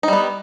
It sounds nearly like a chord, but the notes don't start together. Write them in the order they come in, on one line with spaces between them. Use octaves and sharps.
D#4 G3 B3